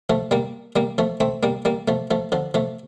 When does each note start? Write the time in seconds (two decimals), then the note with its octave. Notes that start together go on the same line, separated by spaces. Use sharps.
0.10 F3 A3
0.31 G3 A#3
0.76 G3 A#3
0.98 F3 A3
1.20 A3 C4
1.43 G3 A#3
1.65 G3 A#3
1.88 F3 A3
2.11 F3 A3
2.32 D3 F3
2.54 F3 A3